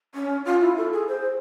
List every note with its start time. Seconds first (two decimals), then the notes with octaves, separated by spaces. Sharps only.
0.14 C#4
0.45 F4
0.61 E4
0.77 A4
0.93 G#4
1.08 C5